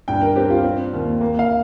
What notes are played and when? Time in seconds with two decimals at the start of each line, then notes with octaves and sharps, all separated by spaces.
0.08 G2 G5
0.21 A#4
0.36 C4 G4
0.50 F4
0.64 C4
0.93 D#2
1.21 A#3
1.39 F5